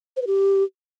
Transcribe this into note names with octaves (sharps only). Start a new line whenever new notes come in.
C5
B4
G4